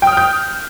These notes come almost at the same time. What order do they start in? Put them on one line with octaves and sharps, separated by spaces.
G5 D#6 F6 G6